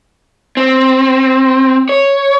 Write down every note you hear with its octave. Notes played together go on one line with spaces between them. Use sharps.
C4
C#5